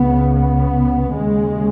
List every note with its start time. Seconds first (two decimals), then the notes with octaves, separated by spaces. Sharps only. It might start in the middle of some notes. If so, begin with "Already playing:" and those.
Already playing: C#2 C#3 B3
0.36 B3
1.12 D#2 C#3 G#3